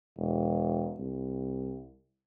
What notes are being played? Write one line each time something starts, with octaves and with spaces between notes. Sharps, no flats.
E1
C2